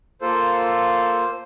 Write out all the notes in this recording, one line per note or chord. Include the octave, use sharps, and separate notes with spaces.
A#3 F4 A4 C5